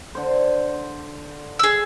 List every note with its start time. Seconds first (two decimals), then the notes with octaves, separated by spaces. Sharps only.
0.15 D3 C5
1.59 G#4 E6